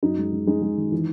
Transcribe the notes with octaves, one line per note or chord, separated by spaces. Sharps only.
F#2 D#4
G#3
G#3
G#3 D#4
G#3
D#3
E3